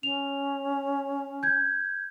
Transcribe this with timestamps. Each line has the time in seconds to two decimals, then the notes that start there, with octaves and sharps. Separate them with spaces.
0.03 C#4 F7
1.43 G6 G#6